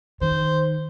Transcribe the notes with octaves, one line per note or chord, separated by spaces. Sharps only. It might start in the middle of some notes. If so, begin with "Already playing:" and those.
D#3 C5